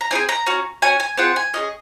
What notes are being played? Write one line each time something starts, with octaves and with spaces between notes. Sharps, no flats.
A#5
C4 D#4 G#4 G#5
A#5
C#4 F#4
C#4 F#4 G#5
G#5
C4 F4 G#4 F#5
G#5
C#4 F4 G#4 D#5